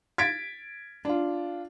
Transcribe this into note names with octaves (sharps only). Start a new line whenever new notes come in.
G#6 A6 B6 D7
D4 F4